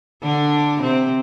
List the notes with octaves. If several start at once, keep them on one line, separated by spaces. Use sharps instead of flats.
D3 D4
C3 C4